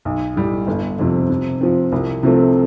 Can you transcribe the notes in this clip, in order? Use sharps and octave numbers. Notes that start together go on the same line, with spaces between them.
B1
A2 G3
G1
F2 C3 F3
C3
F3 C4
C2
C3 F3 A3 C4